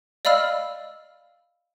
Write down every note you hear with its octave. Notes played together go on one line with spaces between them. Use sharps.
D5 D#5 F5 B5 E6 F6